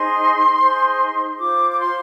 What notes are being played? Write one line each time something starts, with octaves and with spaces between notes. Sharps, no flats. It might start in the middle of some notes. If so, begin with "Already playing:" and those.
Already playing: D#4 G#4 C5 C6
D#4 G#4 C5
F4 C5 D6
D6
C6